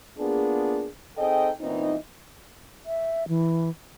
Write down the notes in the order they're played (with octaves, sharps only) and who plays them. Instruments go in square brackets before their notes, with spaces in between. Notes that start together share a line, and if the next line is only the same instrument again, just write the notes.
[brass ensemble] A#3 B3 D4 F4 G#4
C4 D#4 G#4 A4 D#5 G5
A#2 E3 B3 C4 D#4
[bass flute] E5
E3